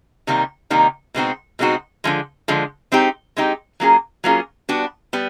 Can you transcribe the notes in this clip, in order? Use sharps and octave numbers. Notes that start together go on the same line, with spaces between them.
C3 D#3 G3 A#3 D#4
C3 D#3 G3 A#3 D#4
B2 G#3 C4 D#4 F#4
B2 G#3 C4 D#4 F#4
D3 F3 G#3
D3 F3 G#3
G#3 C4 D#4 G4
G#3 C4 D#4 G4
F#3 A#3 C#4 F4 G#4
F#3 A#3 C#4 F4 G#4
G3 B3 D4 F#4
G3 B3